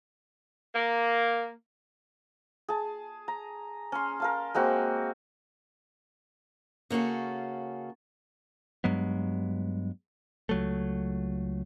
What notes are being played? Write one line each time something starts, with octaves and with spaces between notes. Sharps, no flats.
A#3
G#4 A5
A#5
C#4 C6
A#4 F5 A5
G#3 A#3 C4 F#4
C#3 A#3 C#4 F#4 A4
G2 F#3 G#3 B3
C#2 F#3 A3